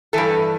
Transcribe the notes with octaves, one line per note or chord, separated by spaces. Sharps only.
G2 E3 A4